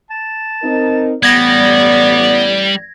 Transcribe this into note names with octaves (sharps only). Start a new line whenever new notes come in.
A5
C4 D#4 A#4
A1 G3 B3 D5 G#6 A#6